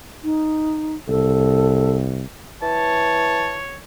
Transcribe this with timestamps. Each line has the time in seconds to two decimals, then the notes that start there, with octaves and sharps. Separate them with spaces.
0.24 D#4
1.08 C2 A4
2.62 E3 C#5 A5